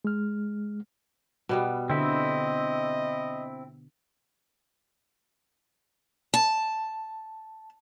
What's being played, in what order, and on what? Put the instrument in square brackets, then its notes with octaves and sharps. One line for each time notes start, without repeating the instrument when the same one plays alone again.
[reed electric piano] G#3 F6
[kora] B2 G3 B3
[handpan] D3 [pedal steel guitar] C4 E4 [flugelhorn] D#5
[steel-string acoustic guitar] A5